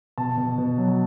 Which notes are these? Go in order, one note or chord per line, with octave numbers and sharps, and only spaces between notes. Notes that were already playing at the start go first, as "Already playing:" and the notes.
B2 A5
B2
B2
F#3
A5